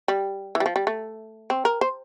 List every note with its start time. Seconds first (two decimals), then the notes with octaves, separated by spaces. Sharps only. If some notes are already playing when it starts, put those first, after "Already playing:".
0.08 G3
0.55 E3
0.60 G3
0.66 F3
0.76 G3
0.87 A3
1.50 C4
1.65 A#4
1.81 C5